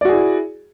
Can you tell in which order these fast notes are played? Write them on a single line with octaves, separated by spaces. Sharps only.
D5 F#4 G#4 E4